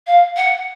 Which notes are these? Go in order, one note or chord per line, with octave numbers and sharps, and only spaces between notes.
F5
F#5